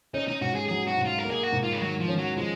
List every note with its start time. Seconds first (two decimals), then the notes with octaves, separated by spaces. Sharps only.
0.14 C#4 D#4
0.28 D#4
0.41 G#2 F#4
0.56 G#4
0.69 F#3 G#4
0.88 F#4
0.97 G#2
1.06 F4
1.19 A#4
1.25 A#3
1.31 G#4
1.43 F#4
1.52 G#2
1.63 F4
1.72 G#3
1.80 D#3 F#3
2.00 F3
2.08 C#4
2.18 F#3
2.36 F3 G#3